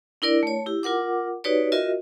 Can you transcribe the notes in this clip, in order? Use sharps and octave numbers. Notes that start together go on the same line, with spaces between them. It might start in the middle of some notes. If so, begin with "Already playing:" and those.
D4 E4 A#4 D5
A3 C#5
E4 G4
F4 A#4 F#5 D6
D#4 F#4 G4 B4 C#5 D5
F4 F#4 A#4 D#5 E5